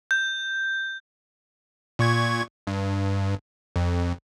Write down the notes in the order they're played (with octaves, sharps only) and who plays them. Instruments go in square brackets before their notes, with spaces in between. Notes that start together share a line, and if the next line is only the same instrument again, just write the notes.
[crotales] G6
[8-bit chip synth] A#2 C#6 G#6
G2
F2